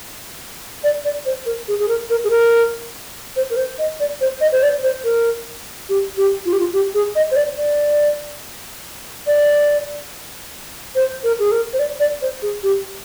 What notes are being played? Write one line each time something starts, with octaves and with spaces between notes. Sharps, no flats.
D5
D5
C5
A#4
G#4
G#4
A#4
A#4
G#4
A#4
C5
A#4
C5
D#5
D5
C5
D#5
C5
D5
C5
A#4
G4
G4
F4
G4
F4
G4
G#4
D#5
C5
D5
D5
D5
C5
A#4
G#4
A#4
C5
D5
D5
C5
G#4
G4